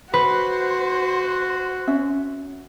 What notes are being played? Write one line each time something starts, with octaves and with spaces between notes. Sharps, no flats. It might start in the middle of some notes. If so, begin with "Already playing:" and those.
F#4 B4 C5
C#4 E5